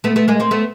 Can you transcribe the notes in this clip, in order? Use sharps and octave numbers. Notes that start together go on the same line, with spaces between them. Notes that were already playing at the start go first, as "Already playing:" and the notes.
A3 B3
A3 B3
G#3 A#3
A#3 C4
A3 B3